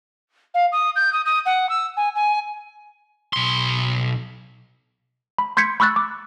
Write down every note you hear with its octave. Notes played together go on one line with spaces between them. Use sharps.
F5
D#6
G6
D#6
D#6
F#5
E6
G#5
G#5
B1 C6
B5
C6 G6 G#6 B6 C#7
B5 C#6 E6 F#6 A6
D6